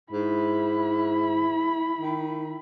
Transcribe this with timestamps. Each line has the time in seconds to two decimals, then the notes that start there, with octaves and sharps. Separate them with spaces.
0.13 G#2 E4 B5
2.01 D#3